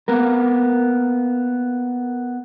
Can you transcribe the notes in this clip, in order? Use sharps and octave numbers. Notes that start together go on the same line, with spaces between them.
A#3 B3 A#4